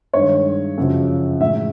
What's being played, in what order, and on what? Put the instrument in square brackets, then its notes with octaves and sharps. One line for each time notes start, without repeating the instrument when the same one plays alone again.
[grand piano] G2 D#3 G#3 C#5
F#2 C#3 F3
A2 E3 G#3 E5